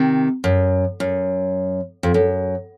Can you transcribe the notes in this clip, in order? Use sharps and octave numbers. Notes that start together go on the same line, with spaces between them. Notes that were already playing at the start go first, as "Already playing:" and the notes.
Already playing: C3 D#3
F#2
F#2
F2
F#2